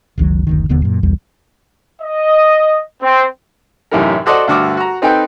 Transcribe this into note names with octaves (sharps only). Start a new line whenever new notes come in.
F#1 C#2 D#3 F#3
F#1 D2 D#3
E1 D#2 D3 B3
F#2 A#2
D#1 B1 E2 G3
D#5
C4
A1 F#2 A2 C3 D#4 A#4
F#4 A4 C5 D5 D#5 F#5
D2 G2 F#4 D6 E6 F6
F#4 A#5
C4 D#4 A4 B4 G5